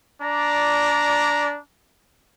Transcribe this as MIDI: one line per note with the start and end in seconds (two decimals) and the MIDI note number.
0.22 1.57 62
0.22 1.57 74
0.22 1.57 82